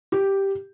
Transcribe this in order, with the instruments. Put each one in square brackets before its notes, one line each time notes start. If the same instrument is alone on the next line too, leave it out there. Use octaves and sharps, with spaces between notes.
[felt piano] G4